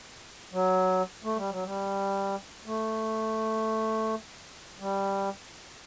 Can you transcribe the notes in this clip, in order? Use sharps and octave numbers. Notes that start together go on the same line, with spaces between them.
F#3
A3
G3
F#3
G3
A3
G3